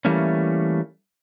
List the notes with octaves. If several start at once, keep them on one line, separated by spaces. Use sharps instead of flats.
E3 G3 A3 A#3 C#4